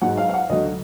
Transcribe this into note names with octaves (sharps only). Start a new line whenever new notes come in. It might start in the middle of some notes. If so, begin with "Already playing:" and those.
G#2 F#3 F#5
F5
F5
F#5
D2 D3 F#3 D#5